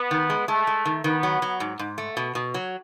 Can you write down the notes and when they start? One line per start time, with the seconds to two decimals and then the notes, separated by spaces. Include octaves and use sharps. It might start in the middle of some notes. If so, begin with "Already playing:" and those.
Already playing: B3
0.11 D#3
0.30 G#3
0.48 G#3 A3
0.67 G#3
0.85 D#3
1.04 D#3 B3
1.23 F#3
1.42 F#3
1.60 G#2
1.79 G#2
1.98 A3
2.17 B2
2.35 B2
2.54 F#3